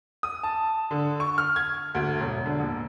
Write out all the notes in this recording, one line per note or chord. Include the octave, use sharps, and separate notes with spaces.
D#6
A5
D3
C#6
F6
G#6
D2
E1
D3
D#1